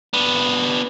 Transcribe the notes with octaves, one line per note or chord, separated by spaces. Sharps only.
B3 D4